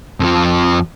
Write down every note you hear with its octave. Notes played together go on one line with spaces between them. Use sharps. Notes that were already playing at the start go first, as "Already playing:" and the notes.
F2 F3